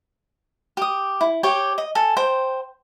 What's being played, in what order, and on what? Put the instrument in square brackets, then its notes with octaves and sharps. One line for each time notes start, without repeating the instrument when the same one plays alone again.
[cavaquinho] G4 D#6
E4
G4 C#5 G5
D#5
A4 G#5
C5 G5